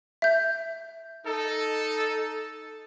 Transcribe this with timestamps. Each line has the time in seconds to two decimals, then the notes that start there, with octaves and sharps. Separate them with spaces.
0.22 E5 G6
1.26 D#4 A4